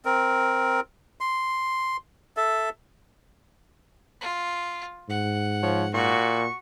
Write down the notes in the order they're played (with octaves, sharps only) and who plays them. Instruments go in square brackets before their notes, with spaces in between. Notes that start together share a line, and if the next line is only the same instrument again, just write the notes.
[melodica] C4 A#4
C6
A4 E5
[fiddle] F4
[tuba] G#2 [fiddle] F#5
[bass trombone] F3 [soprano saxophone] C#5
[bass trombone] A#2 [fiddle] F#4 [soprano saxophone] C#6